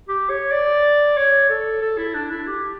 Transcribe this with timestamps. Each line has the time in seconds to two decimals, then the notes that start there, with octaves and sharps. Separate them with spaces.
0.09 G4
0.30 C#5
0.52 D5
1.17 C#5
1.50 A4
1.82 A4
1.98 E4
2.15 D4
2.31 E4
2.47 G4